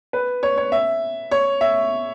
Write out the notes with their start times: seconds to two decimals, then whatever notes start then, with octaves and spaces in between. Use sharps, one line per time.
0.13 B4
0.43 C#5
0.57 C#5
0.72 E5
1.31 C#5
1.61 E5